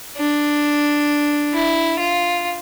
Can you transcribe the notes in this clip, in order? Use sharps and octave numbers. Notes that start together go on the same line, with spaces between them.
D4
E4
F4